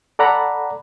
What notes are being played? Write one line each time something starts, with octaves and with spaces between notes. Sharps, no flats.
A4 D5 F#5 A#5 B5